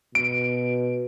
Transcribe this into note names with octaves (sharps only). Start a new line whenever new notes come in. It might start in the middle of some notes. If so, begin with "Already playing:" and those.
B2 D7